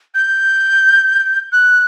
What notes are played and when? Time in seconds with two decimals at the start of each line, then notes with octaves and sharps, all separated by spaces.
0.14 G6
1.52 F#6